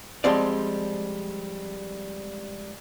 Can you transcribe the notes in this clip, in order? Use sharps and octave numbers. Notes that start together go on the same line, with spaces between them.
F3 G3 G#3 C4 D5